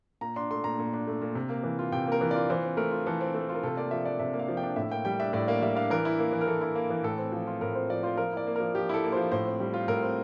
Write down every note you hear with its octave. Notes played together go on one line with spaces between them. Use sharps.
A#2 A#5
D4 C6
A3 C6
A#2 A#5
A#2
D4
A3
A#2
C3
A#3
E3
F4
C3 G5
A#3
A#4
E3
F4 D5
E3 C5
C4
A3 A#4
F4
E3 A4
C4
A3
F4
A#4
C3 A4
A#3 D5
F3 E5
D4 D5
C3 E5
A#3
F5
F3
G5
D4
A2 E5
A#3 G5
G3 G5
D4 E5
A2 D5
A#3 D5
G3 E5
D4 F5
E3 A#4
E4
A#3
E3
A#4
E3 A4
E4
A#3
E3
A2 A4
C4
F3
F4
A2 A#4
C4 C5
F3 D5
F4 C5
F3 A#4
E4 D5
A#3
F3 A#4
F3 G4
E4 A4
A#3
F3 C5
A2 C5
C4
G3
F4
A2 A#4
C4